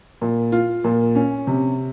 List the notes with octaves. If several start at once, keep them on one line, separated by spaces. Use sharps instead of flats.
A#2
F4
A#2
C#4
C3